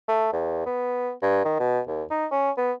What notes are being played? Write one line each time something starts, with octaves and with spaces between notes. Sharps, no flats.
A3
E2
B3
G2
D#3
B2
D#2
D#4
C#4
B3